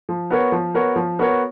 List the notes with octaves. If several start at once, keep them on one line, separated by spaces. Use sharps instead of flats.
F3
B3 F#4 A#4 C#5
F3
B3 F#4 A#4 C#5
F3
B3 F#4 A#4 C#5